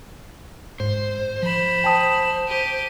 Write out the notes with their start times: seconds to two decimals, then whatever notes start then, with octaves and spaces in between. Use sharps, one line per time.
0.80 G#2 C5
1.43 F3 B5 E7
1.84 G5 A5 D#6
2.48 G4 D#7